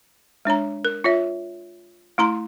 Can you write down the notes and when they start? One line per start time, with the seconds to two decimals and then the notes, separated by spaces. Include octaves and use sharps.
0.45 G#3 D4 C#5 A#5
0.85 A#4
1.04 F4 C#5 E5
2.18 A3 E4 A#5 C6